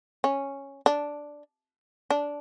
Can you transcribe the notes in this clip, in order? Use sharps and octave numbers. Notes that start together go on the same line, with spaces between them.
C#4
D4
D4